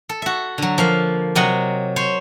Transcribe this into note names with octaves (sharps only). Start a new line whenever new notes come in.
A4
F#4 E5
D3 F#3
F3 A#3 F5
C3 F#3 D#5 F#5 G#5
C5 C#5